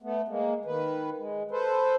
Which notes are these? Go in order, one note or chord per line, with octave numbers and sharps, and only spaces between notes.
A3 B3
G#3 A#3
D#3 B4
G#3
A4 B4 C5